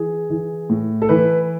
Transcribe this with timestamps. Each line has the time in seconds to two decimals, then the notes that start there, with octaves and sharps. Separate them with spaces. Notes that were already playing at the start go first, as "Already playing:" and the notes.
Already playing: E3 G#4
0.30 E3
0.69 A2
1.02 A4
1.09 E3 B4